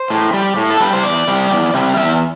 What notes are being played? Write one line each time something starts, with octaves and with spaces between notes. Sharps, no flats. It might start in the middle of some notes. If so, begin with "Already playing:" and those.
Already playing: C5
A2
G3
A2
A4
G3 B4
C5
E2 D5
C3 G3
E2
C3 G3
E2 E5